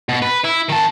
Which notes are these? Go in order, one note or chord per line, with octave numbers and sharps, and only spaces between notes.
B2
B4
E4
D#3 A5